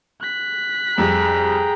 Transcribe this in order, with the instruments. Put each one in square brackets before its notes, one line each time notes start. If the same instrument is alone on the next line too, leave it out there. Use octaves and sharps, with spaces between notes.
[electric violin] F#6 B6
[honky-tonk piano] F2 G3 [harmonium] G#4 G5 A#5